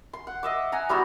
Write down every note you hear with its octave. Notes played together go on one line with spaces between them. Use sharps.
C6
F#5
D#5 E5 D6
F#5 G#5 A#5
G3 B3 E4 F#4